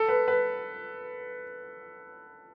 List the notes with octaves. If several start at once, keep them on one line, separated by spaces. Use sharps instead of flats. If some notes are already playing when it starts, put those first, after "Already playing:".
Already playing: A4
B4
B4